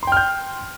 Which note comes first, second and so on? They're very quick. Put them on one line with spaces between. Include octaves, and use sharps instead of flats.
C6 G5 F6 G6